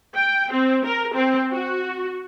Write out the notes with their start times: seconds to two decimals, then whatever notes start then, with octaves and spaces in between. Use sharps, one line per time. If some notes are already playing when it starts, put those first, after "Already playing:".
0.15 G5
0.52 C4
0.85 A#4
1.14 C4
1.51 F#4